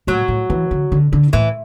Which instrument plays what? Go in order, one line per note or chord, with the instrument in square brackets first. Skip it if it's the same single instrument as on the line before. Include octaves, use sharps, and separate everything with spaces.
[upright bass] A2 [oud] F#3
[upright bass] A2
E3
D3
D3
D3
[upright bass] A2 [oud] E3